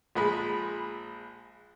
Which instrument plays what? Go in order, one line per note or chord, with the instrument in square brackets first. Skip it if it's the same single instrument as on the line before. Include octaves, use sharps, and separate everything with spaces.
[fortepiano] A#1 G#3 B5